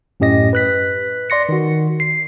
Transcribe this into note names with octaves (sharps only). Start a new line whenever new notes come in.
F#2 A2 C#4 G4 D#5 A#6
B4 F#6 B6
D5 C6 A#6 C#7
D#3 F#4
C7